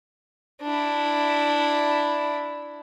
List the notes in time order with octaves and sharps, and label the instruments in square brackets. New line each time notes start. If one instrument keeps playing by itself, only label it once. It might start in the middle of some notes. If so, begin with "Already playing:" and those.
[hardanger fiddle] D4 E4